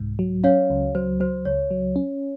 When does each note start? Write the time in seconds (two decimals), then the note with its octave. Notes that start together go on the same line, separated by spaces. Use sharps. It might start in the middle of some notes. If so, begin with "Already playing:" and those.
Already playing: C2 G#2
0.19 F#3
0.44 C#4 C#5 F5
0.70 C#2
0.95 F#3 C5
1.20 F#3 C5
1.45 C#2 C#5
1.71 F#3
1.96 C#4